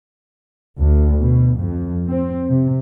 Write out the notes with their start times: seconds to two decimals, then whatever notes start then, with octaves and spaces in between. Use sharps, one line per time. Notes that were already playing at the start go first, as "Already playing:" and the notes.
0.78 D2
1.20 B2
1.56 F2
2.08 C4
2.49 C3